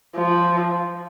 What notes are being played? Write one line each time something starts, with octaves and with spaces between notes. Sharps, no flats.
F3